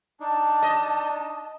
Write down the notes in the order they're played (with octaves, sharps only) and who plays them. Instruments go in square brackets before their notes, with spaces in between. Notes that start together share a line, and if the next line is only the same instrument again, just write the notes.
[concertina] D4 D#4 [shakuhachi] A5
[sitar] D#5